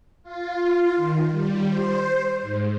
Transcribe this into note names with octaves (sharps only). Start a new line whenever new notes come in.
F4
D#3
G3
C5
G#2